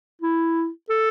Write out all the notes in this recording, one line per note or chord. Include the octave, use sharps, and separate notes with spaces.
E4
A4